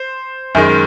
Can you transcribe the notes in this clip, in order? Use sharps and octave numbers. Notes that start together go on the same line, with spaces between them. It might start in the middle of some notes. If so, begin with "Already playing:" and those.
Already playing: C5
F#2 D#3 G#3